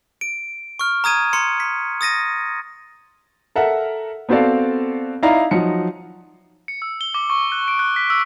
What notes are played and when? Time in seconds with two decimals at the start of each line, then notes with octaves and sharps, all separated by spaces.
0.21 D7
0.79 C#6 F6
1.04 A#5 D#6 G#6 D#7
1.33 A#5 C6 C#7
1.60 B6
2.01 D#6 A6 A#6 D#7
3.56 A4 A#4 E5 F#5
4.29 B3 C4 F#4 A4 D5 F5
5.22 D#4 E4 D5 F5 A#5
5.51 F3 F#3 D#4 C#7
6.68 C#7
6.82 E6
7.01 G7
7.14 D6
7.30 C#6
7.52 F#6
7.68 D7
7.79 F#6
7.96 B6
8.10 E6